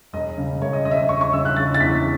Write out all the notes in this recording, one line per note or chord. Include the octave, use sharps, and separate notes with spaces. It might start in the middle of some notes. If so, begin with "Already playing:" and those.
E1 D#5
C#3
E1 C#5
D#5
E1 D#5
E5
D#5
E1 C#6
C#6
C#3 E6
F#6
C#3 A6
A6
E2 B6